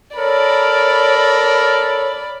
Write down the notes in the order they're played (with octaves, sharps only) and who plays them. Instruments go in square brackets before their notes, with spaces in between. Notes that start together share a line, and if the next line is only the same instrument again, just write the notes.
[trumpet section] A4 A#4 [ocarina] C#5 [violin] D5 B5